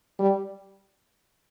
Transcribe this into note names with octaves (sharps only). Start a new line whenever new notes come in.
G3